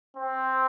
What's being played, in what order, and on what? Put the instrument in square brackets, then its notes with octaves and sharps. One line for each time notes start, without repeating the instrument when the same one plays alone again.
[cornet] C4